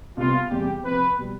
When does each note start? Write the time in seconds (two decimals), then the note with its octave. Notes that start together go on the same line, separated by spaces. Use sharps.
0.17 C2 C3 G3 B3 F4
0.50 E2 C3 G3 B3 G4
0.83 C3 F3 C4 B4
1.18 B2 G3